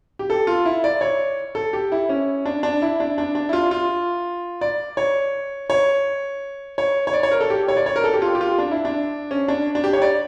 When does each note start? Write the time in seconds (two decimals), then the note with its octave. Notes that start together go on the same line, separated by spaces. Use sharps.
0.19 G4
0.30 A4
0.47 F4
0.66 E4
0.84 D5
1.01 C#5
1.55 A4
1.73 G4
1.92 E4
2.09 C#4
2.45 D4
2.63 D4
2.82 E4
3.00 D4
3.18 D4
3.35 D4
3.49 E4
3.53 F4
3.71 F4
4.61 D5
4.97 C#5
5.70 C#5
6.78 C#5
7.07 C#5
7.13 D5
7.23 C#5
7.31 A#4
7.40 A4
7.50 G4
7.68 C#5
7.77 D5
7.86 C#5
7.96 A#4
8.04 A4
8.13 G4
8.22 F4
8.35 G4
8.41 F4
8.58 D4
8.71 E4
8.85 D4
9.31 C#4
9.48 D4
9.75 D4
9.84 G4
9.93 C#5
10.02 D5